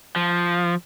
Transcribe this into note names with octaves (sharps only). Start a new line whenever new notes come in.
F3